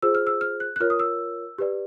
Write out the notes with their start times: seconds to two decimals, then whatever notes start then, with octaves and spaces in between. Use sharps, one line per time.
0.02 F4 G#4 C5 E6
0.15 F6
0.27 E6
0.41 F6
0.60 F#6
0.76 F#6
0.80 F4 A#4 C#5 F6
0.90 D#6
0.99 E6
1.58 G4 B4 D5